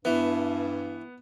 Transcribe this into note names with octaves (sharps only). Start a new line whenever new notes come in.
G2 E3 B3